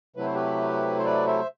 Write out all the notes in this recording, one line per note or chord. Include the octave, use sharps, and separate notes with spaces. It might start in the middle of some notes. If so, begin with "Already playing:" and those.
C3 F#3 A3 E4 B4
C5
G4 B4
C5
B4 D5
C5 E5